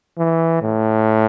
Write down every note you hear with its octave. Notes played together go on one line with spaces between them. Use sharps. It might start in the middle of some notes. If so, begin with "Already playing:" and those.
E3
A2